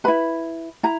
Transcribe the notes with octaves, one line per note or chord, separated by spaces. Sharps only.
E4 B4 B5
E4 A#5